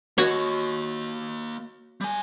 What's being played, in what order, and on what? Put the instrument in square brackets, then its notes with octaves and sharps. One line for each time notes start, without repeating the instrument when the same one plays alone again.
[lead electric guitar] A#3 D#5 [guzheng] F#4 C#5
[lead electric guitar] G3 G#5